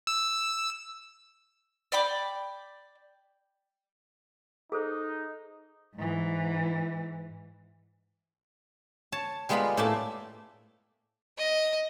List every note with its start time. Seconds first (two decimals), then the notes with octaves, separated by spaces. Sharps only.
0.07 E6
1.92 D5 G5 B5 D6
4.72 D#4 G#4 A4 C5
5.95 G#2 E3
9.12 C#5 A5
9.49 G3 G#3 B3 F4 A#4 B5
9.77 A2 A3 A#3 D5 E5 A5
11.38 D#5